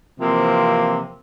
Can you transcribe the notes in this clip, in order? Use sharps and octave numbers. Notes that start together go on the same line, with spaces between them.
C3 E3 F3 A#3 C4